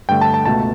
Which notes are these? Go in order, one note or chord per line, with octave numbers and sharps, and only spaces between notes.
G2 D3 A3 G5
A5
A5
C#2 B2 A3 A5